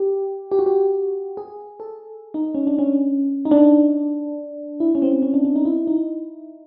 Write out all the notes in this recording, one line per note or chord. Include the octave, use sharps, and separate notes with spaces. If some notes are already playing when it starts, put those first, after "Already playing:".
Already playing: G4
G4
F#4
G4
G#4
A4
D#4
C#4
D4
C#4
D#4
D4
E4
C#4
C4
C#4
D4
D4
D#4
E4
D#4